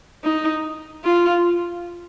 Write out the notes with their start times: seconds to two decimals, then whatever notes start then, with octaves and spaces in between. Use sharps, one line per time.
0.24 D#4
1.04 F4